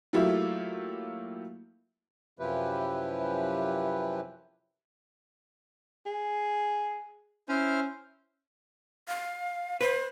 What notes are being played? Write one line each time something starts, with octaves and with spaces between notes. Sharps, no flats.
F#3 A3 A#3 E4 F4 G4
F#2 C3 F3 E4 G4 B4
G#4
C#4 E4 C5 F6
F5
B4 C5